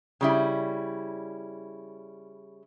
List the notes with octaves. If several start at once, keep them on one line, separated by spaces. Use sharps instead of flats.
C#3 G3 E4